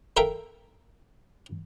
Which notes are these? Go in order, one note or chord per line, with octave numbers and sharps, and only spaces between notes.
A4 A#4 E5 F5 G5